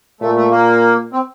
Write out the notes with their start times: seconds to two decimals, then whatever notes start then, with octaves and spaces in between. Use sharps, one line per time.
0.21 A#2 A3
0.36 A3
0.51 A#3
1.13 C4